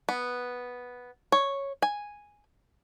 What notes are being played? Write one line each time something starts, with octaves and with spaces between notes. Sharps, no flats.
B3
C#5
G#5